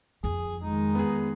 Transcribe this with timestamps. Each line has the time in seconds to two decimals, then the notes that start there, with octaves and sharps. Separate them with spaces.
0.24 F2 G#4
0.63 D#3 G#3 D#4
0.95 B3 G#4